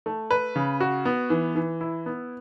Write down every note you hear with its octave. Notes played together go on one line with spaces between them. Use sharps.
A3
B4
C#3
F#4
B3
E3
E3
E4
B3